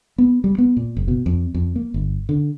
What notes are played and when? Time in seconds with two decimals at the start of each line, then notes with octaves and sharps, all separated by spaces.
0.18 B3
0.44 G3
0.58 B3
0.77 A#2
0.97 F#1
1.08 B2
1.26 F2
1.54 F2
1.76 A#3
1.94 G1
2.29 D3